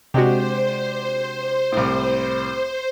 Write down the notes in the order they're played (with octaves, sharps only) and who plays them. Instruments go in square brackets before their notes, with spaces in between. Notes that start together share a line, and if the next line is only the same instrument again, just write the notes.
[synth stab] C3 G#3 F#4 [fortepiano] D4 G4 [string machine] C5
[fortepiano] C2 A2